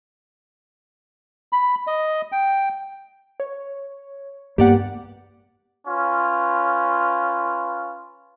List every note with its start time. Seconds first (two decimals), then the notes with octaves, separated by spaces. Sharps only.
1.53 B5
1.87 D#5
2.32 G5
3.40 C#5
4.58 G2 A#3 B3 G4 D5 F#5
5.88 C#4 F4 B4